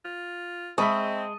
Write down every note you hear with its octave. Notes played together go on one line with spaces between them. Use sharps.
F4
G#3 C4 D#5 E5 A5 B5 C#6